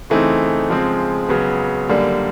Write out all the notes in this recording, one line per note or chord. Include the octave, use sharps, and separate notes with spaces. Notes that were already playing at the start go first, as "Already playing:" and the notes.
C#3 E3 A3 C4 D#4
C#3 F3 G#3 C4
C#2 C#3 F#3 B3
F#2 D3 G3 A#3